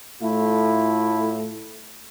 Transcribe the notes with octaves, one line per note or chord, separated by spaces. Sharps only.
A2 A3 E4 F4